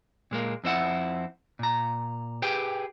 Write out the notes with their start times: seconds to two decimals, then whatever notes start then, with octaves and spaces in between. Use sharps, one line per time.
0.31 A#2 G#3 A#3
0.64 F2 C4 E4 F#5
1.59 A#2 A#5
2.42 G4 G#4 B4 G5